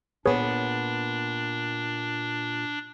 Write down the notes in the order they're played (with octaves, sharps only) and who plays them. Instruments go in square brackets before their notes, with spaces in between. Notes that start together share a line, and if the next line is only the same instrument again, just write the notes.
[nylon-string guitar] A#2 B3 [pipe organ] D4 [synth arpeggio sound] G#4 B4 C#5